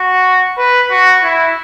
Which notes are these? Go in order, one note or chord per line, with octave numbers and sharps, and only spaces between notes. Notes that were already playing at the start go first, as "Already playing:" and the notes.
Already playing: F#4
B4
F#4
E4